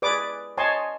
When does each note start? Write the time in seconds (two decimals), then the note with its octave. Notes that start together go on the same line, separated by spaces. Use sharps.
0.02 G#4 B4 D5 D6 D#6
0.57 C#5 D#5 G#5 A5 C6